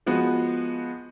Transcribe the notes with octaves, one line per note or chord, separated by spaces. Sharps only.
F3 G#3 B3 F#4